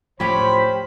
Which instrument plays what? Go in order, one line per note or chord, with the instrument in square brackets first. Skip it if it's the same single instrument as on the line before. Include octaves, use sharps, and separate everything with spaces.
[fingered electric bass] D1 A2 F3 [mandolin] C#4 G4 C#5 [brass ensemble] C5 [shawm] B5